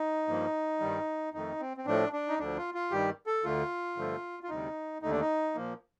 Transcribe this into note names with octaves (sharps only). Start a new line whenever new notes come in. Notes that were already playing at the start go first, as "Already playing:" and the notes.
Already playing: D#4
G2 F3 A#3
G2 D#3 G3
F2 D#3 A3 D#4
C4
C4
A2 F3 A3 D4
D4
D#4
D2 D3 F3 D4
F4
F4
G2 D#3 G3 G4
A4
D2 D3 A3 F4
G2 D3 F3 A3
F4
D2 C3 G3 D#4
D#2 D3 A3 D#4
D4
D#4
A#2 F3 A#3